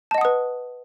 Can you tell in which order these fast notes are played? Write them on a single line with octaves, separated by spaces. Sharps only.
A5 D#5 F#5 D#6 B4